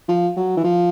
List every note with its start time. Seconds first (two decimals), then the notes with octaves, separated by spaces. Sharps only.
0.08 F3
0.37 F#3
0.57 E3
0.64 F3